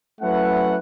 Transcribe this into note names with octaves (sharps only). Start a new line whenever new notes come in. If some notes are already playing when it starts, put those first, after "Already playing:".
F#3 A3 C#4 E4 B4 F#5